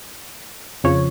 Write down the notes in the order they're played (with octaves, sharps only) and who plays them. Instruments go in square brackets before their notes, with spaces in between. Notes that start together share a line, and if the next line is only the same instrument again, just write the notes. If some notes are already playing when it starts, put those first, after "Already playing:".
[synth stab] F2 C#3 F3 C#5